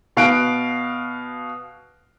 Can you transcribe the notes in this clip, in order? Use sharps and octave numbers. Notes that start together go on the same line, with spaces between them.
B2 F5 F#6 D7